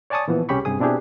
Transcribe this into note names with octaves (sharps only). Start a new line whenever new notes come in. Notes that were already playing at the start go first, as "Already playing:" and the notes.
C#5 D5 G#5 A5 C#6 D#6
A#2 E3 F3 B3
C2 C#4 G4 G#4 B5 C#6
G2 C3 G#4 D#6
B2 C4 D4 E4 G4 G#4